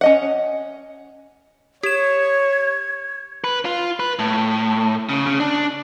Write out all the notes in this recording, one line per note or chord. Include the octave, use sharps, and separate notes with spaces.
C#4 D#5 F#5
G4 C#5 G#6 E7
B4
F4
B4
A2
C#3
C#3
D4